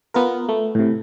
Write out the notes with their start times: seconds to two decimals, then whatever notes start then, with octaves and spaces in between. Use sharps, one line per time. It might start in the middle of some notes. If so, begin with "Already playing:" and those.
0.14 B3 F4 A#4
0.49 A3
0.75 A2 C3